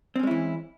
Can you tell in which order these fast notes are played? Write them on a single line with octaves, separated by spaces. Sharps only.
C4 C#4 G#3 E4 E3